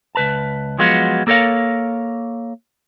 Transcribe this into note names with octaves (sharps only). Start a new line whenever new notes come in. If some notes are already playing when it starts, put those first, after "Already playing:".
C#2 B4 A5
F3 F#3 G#3 B3 F4 F#4
A#3 A4 A#4 C#5 F5